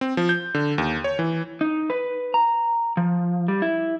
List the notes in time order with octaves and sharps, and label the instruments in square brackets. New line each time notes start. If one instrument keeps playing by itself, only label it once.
[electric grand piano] C4
F3
G6
D3
D#2
C#5
E3
[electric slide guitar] D#4
B4
A#5
F3
G3
E4